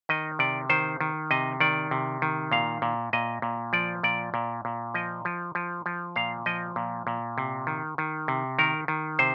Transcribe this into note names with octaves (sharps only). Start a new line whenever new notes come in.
D#3 D#5
C3 D5
D#3 C5
D#3
C3 D#5
D#3 D5
C3
D#3
A#2 F5
A#2
A#2 D#5
A#2
F3 D5
A#2 D5
A#2
A#2
F3 D#5
F3
F3
F3
A#2 F5
F3 D#5
A#2
A#2
C3
D#3
D#3
C3
D#3 A#4
D#3
C3 C5